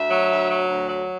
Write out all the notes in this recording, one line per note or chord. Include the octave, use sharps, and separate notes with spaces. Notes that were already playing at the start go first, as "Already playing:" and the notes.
Already playing: D2 E5
F#3
D2
F#3
D2
F#3